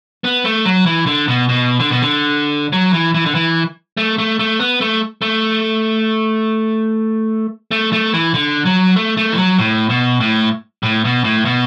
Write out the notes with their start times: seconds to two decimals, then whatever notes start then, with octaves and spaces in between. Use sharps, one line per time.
0.24 B3
0.45 A3
0.65 F#3
0.86 E3
1.06 D3
1.28 B2
1.49 B2
1.80 D3
1.90 B2
2.02 D3
2.73 F#3
2.93 E3
3.14 E3
3.26 D3
3.35 E3
3.97 A3
4.18 A3
4.39 A3
4.60 B3
4.81 A3
5.22 A3
7.71 A3
7.93 A3
8.14 E3
8.34 D3
8.65 F#3
8.96 A3
9.17 A3
9.32 E3
9.38 F#3
9.59 A2
9.89 B2
10.20 A2
10.83 A2
11.05 B2
11.24 A2
11.45 B2